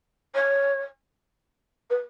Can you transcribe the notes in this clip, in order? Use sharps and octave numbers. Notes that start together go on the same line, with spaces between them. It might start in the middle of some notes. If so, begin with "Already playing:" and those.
C#5
B4